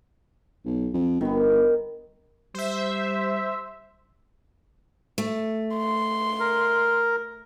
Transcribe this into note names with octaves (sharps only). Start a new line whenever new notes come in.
B1
F2
G1 D#3 B3
G3 C5 E5
A3
C6
A#4